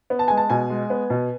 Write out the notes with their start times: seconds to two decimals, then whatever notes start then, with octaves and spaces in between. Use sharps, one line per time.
0.10 B3
0.19 A5
0.28 G#3 G#5
0.37 A5
0.50 B2 G#5
0.70 G#3
0.90 B3
1.10 B2